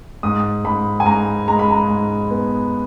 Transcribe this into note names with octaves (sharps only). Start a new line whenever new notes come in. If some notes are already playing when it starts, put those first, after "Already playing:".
G#2 D#6
G#2 B5
G#5
G#2 A#5
G#3 A#5
B5
A#5
G#2
B3